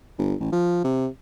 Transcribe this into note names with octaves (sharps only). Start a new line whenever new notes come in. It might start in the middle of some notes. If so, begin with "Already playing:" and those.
G1
A1
F3
C3